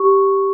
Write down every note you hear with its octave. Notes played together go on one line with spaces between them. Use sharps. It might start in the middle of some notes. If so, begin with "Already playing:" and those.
Already playing: G4 C#6